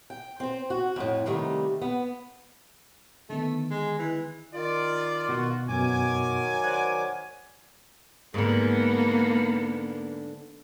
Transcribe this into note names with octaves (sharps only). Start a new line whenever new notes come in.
G5
C4 C5
F#4
F2 A2
C3 D#3 G3 A3
B3
D3 D#3 A3 B3
G#3
E3
D#3 F4 D5
B2 F#4
F#2 B2 D#3 F#3 G#5 D6
C5 D5 F#5
G#2 D3 A#3 B3